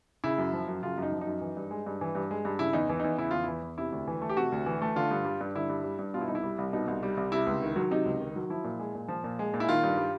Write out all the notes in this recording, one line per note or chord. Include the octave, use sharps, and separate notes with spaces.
C#3 E4
F#2
F3
F#2
C#3 F4
F#2 D#4
F3
D#4
F#2
E3
G2
G#3
G2
E3
G2
G#3
G2
C#3 E4
E2 D#4
E3
E2 D#4
C#3 E4
E2 F4
E3 E4
E2
C3 E4
D2
E3
A3
G4
C3 F#4
D2
E3
A3
D3 F4
G2
G3
G2
D3 E4
G2
G3
G2
B2 F4
E4
C2 D#4
E4
G3
C2
B2 D#4
C2
G3
C2
C3 E4
C#2
D#3
F#3
C3 D#4
C#2
D#3
F#3
F3 E4
A#2
G#3
A#2
F3
A#2
G#3
A#2
E4
D#3 F4
G2
G3